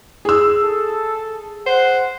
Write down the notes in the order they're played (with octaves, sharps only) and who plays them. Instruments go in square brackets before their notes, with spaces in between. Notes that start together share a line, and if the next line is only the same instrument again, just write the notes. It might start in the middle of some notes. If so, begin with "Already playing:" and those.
[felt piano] G#4 E6
[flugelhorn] A4
[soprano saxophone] C5 [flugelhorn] F#5